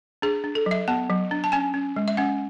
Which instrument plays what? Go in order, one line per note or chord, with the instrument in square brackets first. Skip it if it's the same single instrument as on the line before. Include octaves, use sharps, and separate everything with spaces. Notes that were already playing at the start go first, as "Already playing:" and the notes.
[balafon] D4 G#4
D4
A4
F#3 E5
B3 A5
F#3
D4
A5
C#4 G#5
C#4
G#3
E5
C#4 F#5